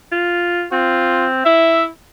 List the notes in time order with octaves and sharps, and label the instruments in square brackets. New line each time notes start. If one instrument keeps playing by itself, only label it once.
[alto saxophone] F4
[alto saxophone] C4 [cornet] F4
[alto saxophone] E4 [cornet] E5